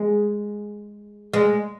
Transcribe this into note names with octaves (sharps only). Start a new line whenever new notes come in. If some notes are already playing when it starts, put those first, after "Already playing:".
Already playing: G#3
G#3